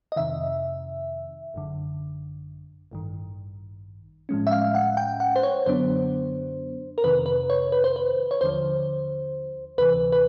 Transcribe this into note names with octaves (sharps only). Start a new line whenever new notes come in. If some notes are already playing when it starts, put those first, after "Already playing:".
D#5
F2 C3 D#3 E5
G#1 F#2 D3
A1 G2 D#3
A2 F3 G#3 C#4
E5
F5
F#5
G5
F#5
C5
C#5
F#2 D3 F#3 B3 D4 C5
A#4
F2 C3 D#3 B4
B4
C#5
B4
C5
B4
C#5
D#2 D3 F3 C5
D2 C3 E3 B4
B4